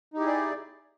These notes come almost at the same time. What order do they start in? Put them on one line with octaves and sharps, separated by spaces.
D#4 G4 E4 G#4 D5